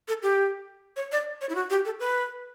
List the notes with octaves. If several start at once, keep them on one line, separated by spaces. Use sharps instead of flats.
A4
G4
C#5
D5
C#5
E4
F#4
G4
A4
B4